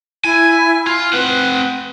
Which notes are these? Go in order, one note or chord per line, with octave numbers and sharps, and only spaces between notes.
E4 G#5
F4
C4 B4 F#5